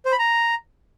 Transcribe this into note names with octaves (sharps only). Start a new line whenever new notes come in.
C5
B5
A#5